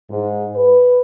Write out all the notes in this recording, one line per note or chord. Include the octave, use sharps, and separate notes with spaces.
G#2
B4